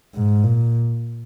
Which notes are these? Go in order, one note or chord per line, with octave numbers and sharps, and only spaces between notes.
G#2
A#2